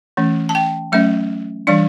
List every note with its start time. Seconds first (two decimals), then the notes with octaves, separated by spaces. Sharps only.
0.17 E3 A3 C#4
0.49 A5
0.55 G5
0.92 F#3 A3 C#4 E5
1.67 E3 G3 D4 D5